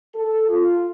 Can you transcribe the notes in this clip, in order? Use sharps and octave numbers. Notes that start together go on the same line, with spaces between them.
A4
F4